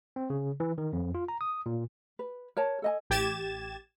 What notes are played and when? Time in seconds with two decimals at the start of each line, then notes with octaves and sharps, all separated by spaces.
0.16 C4
0.30 C#3
0.60 E3
0.78 D#3
0.93 F2
1.15 F4
1.28 A#5
1.41 D#6
1.66 A#2
2.19 B4
2.57 A#4 C#5 A5
2.82 A4 D#5 G#5
3.10 A1 G4 G#6 A6 E7